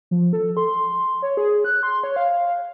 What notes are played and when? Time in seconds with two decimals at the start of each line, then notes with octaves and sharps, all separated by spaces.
0.11 F3
0.33 A4
0.57 C6
1.22 C#5
1.37 G#4
1.65 F#6
1.83 C6
2.04 C#5
2.16 F5